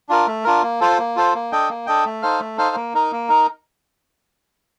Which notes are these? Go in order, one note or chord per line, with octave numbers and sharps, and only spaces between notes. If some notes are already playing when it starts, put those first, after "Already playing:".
D4 F4 A#4
A3
D4 F4 A#4
A#3
F4 A4 C5
A#3
F4 A4 C5
A#3
D4 A4 D#5 G5
A#3
D4 A4 D#5 G5
A3
D#4 A4 C5 F5
A3
D#4 A4 C5 F5
A#3
D#4 A#4
A#3
D#4 A#4